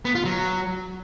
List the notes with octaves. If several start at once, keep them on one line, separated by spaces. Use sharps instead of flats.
B3
F4
F#3